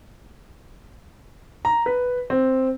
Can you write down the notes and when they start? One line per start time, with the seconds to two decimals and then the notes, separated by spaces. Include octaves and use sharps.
1.65 A#5
1.86 B4
2.30 C4